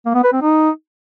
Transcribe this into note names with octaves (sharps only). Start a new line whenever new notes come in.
A#3
B3
B4
C4
D#4